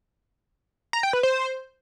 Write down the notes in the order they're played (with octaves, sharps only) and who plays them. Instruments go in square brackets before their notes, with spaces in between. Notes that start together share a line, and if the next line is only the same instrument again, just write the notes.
[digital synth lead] A#5
G5
B4
C5